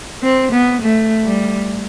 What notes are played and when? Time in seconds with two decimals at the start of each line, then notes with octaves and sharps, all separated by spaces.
0.23 C4
0.52 B3
0.81 A3
1.26 G3